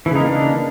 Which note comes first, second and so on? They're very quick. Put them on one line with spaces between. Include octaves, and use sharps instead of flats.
E3 C#3 D#4 A#3 D4